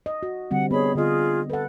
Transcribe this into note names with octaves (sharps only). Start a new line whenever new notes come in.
D#5
F#4
D3 G3 C4 F#5
B3 G#4 C#5 D#5 B5
D3 F4 G#4 D#5
A4 B4 F#5